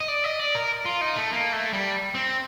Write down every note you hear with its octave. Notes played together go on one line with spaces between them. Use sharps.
D#5
D5
D#5
D5
A#4
F4
D#4
A3
A#3
A3
G3
C4